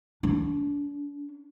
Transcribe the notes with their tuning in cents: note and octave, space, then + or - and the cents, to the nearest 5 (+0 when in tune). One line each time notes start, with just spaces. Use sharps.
D4 -35